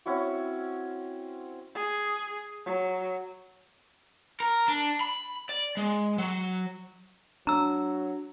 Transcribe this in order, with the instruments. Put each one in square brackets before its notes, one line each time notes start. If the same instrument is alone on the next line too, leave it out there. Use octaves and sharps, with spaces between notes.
[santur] C4 C#4 E4 F#4
[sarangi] G#4
F#3
[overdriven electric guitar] A#4
D4
B5
D5
G#3
F#3
[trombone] F#3 [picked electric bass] D4 [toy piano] A#5 E6